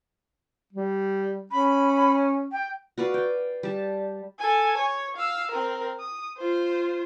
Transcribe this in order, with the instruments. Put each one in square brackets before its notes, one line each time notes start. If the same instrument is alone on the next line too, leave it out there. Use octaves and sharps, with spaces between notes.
[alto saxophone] G3
[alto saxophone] C#4 [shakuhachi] B5
[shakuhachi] G5
[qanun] F#4 B4 D5 F5
G5
G3 A5
[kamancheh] A4 G#5
C#5
F5 E6
C4 A#4
D#6
F4 C5